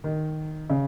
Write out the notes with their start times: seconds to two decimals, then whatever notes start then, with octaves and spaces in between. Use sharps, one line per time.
0.04 D#3
0.70 C#3